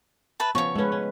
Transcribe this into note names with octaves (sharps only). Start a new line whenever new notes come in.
B4 E5 A5
C#3 F3 B3 C#5 C#6
G#3 A3 C#4 B4
C#4